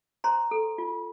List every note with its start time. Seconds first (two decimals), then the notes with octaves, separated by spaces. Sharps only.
0.24 C5 A#5 C6
0.51 A4
0.78 F4